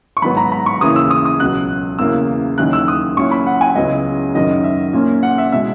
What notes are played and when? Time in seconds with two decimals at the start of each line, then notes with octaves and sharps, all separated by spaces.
0.17 C#6
0.22 G#2 D#3 F#3 B3 B5
0.37 A#5
0.52 B5
0.66 C#6
0.81 D#2 C#3 E3 A#3 E4 D#6
0.96 E6
1.10 D#6
1.25 D#6
1.40 C#2 B2 F#3 F#6
1.99 E2 C#3 E3 A#3 E4 E6
2.58 D#2 D#3 F#3 C#4 E4 F#6
2.73 E6
2.88 D#6
3.17 A#2 F#3 C#4 E4 C#6
3.31 B5
3.47 F#5
3.61 G#5
3.75 C#2 C#3 F#3 B3 E4 D#5
4.35 F#2 D#3 F#3 D#5
4.64 E5
4.93 A#2 A#3 C#4
5.23 F#5
5.38 E5
5.52 B2 G#3 E5